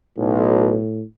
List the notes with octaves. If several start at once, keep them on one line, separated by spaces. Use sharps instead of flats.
B1 A2